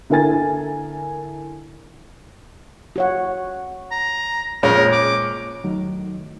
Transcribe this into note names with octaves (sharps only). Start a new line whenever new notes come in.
D3 E4 A#4 G#5 A6
F#4 C#5 F#5
A#5
F2 A#2 G#3 C#4 A#4
D6
E2 D#3 F#3 A3 D#4